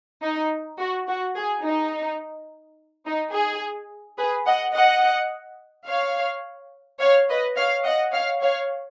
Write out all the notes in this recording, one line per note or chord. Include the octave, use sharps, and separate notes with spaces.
D#4
F#4
F#4
G#4
D#4
D#4
G#4
G#4 B4
D#5 F#5
D#5 F#5
C#5 F5
C#5 F5
B4 D#5
C#5 F5
D#5 F#5
C#5 F5
C#5 F5